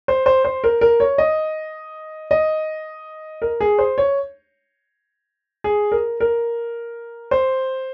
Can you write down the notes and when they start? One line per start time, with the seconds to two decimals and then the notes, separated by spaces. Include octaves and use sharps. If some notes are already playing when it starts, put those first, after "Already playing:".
0.08 C5
0.26 C5
0.45 C5
0.64 A#4
0.81 A#4
1.00 C#5
1.18 D#5
2.31 D#5
3.42 A#4
3.61 G#4
3.78 C5
3.98 C#5
5.64 G#4
5.92 A#4
6.20 A#4
7.31 C5